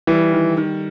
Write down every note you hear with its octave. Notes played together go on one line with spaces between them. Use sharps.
E3 G3
D#3
D#3